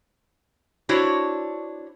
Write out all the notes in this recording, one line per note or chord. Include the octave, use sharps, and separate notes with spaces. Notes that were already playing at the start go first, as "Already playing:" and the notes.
D4 E4 F#4 C5 C#5